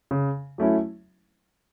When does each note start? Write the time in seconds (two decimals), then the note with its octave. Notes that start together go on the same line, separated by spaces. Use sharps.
0.11 C#3
0.58 F#3 A3 C#4 E4